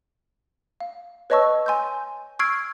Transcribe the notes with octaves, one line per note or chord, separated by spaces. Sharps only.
F5
B4 C#5 D#5 A5 C#6 E6
G#5 C6 E6 G6
C#6 E6 F6 G#6 C7 D7